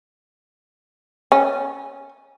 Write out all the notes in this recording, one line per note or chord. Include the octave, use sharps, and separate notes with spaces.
C#4